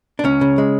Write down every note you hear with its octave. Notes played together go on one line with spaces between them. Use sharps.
D4
C#2 C#4
C#3
G#3